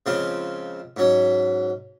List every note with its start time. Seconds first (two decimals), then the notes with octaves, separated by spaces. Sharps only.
0.06 C#2 C#3 F3 C4 F4
0.97 G#2 F#3 C#4